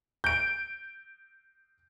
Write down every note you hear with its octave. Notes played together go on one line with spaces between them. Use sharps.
G6 D7